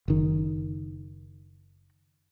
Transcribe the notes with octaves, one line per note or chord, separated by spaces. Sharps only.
F#1 D#3